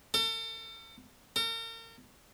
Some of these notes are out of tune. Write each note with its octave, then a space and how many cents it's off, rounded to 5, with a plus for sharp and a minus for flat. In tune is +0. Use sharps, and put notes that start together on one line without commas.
A4 +40
A#4 -40